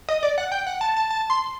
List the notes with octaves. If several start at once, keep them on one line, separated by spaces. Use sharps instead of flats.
D#5
D5
F#5
G5
F#5
A5
A5
A5
C6